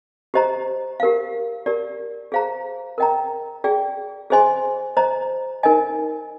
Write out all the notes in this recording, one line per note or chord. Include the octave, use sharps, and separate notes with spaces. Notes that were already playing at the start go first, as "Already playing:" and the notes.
G4 C5 D#5 A#5
G4 A#4 F5
G4 A#4 D5
G#4 C5 F5 A#5
A#4 D#5 G5 A#5
G#4 D5 G5
G#4 C5 D#5 G#5 C6
C5 D#5 A#5
D#4 A#4 D#5 G#5